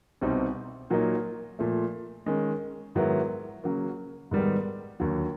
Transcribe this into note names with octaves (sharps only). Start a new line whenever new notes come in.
C2 B2 G3 C4 D#4
A#2 F#3 A#3 D#4
A#2 F3 A3
D#3 G#3 C#4
G#2 D#3 F#3 B3 E4
C#3 F#3 A#3
G#2 D#3 G3 B3
D#2 D3 F#3